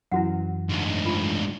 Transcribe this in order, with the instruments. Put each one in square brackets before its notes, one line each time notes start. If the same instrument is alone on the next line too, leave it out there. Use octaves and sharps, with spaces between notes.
[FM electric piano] F#2 E3 [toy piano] E4 F#4 F#5
[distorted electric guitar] D2 G#2
[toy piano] F4